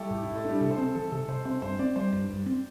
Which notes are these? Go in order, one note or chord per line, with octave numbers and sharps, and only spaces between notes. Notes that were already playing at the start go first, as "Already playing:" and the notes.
Already playing: G3 A3 E4 G4 A4
A2 G4
E4
A2
A3
G3 D4
C3 A4
C5
C4 A4
E3 A4
C3 A4
C3 C5
C4 C5
G2 C5
C4 D5
G3 C5
G2
G2
C4